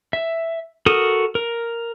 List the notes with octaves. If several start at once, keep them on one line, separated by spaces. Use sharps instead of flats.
E5
F#4 A4 A#4 D#6
A#4